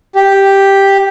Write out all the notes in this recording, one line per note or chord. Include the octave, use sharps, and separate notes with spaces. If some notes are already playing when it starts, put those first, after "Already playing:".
G4